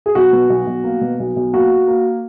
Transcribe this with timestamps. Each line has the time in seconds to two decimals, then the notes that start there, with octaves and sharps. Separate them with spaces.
0.06 G#4
0.15 B1 F#4
0.32 B2
0.50 B1
0.67 B1
0.84 A#3
1.01 B2
1.20 B1
1.36 B1
1.53 A#3 F#4
1.70 A#3
1.88 A#3